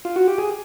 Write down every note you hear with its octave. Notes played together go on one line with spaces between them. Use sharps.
F4
F#4
G4
G#4